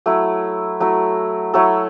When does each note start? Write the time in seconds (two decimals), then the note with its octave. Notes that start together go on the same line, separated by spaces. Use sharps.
0.06 F#3 A3 E4
0.80 F#3 A3 E4
1.54 F#3 A3 E4 A4 C#5